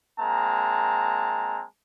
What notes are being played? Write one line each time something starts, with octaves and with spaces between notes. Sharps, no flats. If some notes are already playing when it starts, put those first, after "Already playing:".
G#3 A#3 C4 A5 A#5